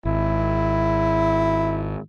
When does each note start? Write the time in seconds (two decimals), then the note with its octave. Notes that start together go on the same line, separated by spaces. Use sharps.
0.05 G#1 E4